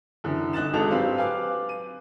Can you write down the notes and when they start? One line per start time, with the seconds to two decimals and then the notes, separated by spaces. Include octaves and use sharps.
0.24 F#2 D3 E3
0.53 G1 D#4 F#6 A6 E7
0.73 G#1 G#3 D4 D#4 A4 F7
0.91 F#3 C4 G4 B4 C5 F5
1.17 B4 F5 G#5 D6 F#6
1.69 D#7